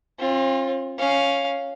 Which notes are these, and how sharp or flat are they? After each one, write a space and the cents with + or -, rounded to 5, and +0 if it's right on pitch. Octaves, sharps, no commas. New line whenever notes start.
C4 +45 F4 +0
C#4 +0 F5 +0